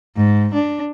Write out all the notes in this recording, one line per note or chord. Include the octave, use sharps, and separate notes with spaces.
G#2
D4